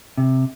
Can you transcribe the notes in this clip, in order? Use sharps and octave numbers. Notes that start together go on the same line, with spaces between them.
C3